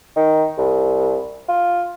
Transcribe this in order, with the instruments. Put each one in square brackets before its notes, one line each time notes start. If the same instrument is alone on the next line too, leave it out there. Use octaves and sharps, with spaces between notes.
[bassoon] D#3
C2
F4